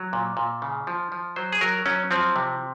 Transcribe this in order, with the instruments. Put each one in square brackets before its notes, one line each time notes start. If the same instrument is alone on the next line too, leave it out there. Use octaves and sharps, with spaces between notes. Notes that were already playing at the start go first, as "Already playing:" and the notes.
Already playing: [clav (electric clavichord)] F#3
A#2
A#2
C#3
F3
F3
F#3 C5
G#4
F#3 A#4
F#3 C#4
F3 C4
C3